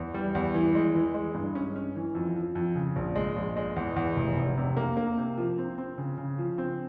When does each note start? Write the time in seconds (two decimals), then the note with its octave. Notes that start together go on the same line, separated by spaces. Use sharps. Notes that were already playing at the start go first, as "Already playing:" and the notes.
Already playing: E2
0.14 G3
0.35 E2
0.54 E3
0.75 G#3
0.94 E3
1.14 G#3
1.35 G2
1.55 C#4
1.76 C#4
1.96 E3
2.15 F2
2.36 F3
2.55 F2
2.75 C#3
2.96 A#1
3.16 G#3
3.36 A#1
3.57 G#3
3.76 E2
3.96 E2
4.16 F1
4.36 F1
4.58 C3
4.77 A#3
4.97 A#3
5.17 C3
5.38 F3
5.58 C4
5.78 C4
5.98 C#3
6.18 C#3
6.38 F3
6.58 C4